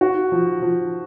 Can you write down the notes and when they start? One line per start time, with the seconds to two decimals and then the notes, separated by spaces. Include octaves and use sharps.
0.01 F#4
0.32 F3
0.62 F3